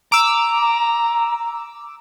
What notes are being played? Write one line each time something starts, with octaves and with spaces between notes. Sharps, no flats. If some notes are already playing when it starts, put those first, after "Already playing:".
A#5 D6 E6